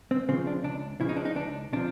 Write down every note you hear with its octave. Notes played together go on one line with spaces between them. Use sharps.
C4
C#3 F3 C4
D4
C#2 D4
C#3 F3 E4
D#4
D4
D#4
C#2 D4
C3 F3 D4